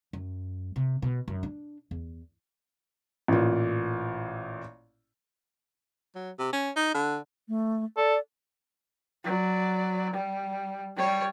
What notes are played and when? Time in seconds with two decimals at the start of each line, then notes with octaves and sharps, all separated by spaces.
0.13 F#2
0.76 C3
1.02 B2
1.28 F#2
1.43 D4
1.91 E2
3.28 A1 A#2
6.15 F#3
6.39 C3
6.53 C#4
6.76 D#4
6.95 D3
7.48 A3
7.97 A4 D5
9.24 F#3 D5
10.13 G3
10.97 G3 C#5